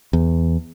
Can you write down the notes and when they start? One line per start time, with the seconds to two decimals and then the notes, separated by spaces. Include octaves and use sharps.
0.13 E2